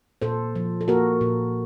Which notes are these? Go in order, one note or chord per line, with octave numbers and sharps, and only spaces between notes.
A#2 A4 C5
F3
A4
A#3 F#4 A#4
A#2